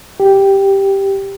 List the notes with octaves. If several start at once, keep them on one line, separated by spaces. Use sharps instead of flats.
G4